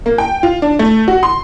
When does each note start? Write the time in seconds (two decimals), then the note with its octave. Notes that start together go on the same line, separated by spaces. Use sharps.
0.06 A#3
0.18 G5
0.43 F4
0.62 D4
0.79 A3
1.08 F#4
1.23 C6